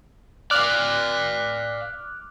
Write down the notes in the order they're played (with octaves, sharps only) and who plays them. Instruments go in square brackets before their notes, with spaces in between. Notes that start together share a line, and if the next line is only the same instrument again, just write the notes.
[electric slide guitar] D5 F5 [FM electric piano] D6 F6 F#6